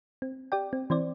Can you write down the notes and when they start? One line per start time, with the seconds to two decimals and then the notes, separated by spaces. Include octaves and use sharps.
0.22 C4
0.52 G4 D5 G5
0.73 C4
0.90 E3 C4 C5 D5